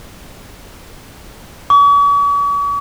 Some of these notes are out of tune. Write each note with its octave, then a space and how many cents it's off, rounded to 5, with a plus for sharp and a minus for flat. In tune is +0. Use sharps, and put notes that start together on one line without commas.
C#6 +45